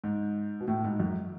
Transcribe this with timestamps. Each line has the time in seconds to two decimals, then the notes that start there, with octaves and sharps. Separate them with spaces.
0.04 G#2
0.60 B2
0.68 A2
0.84 G#2
1.00 F#2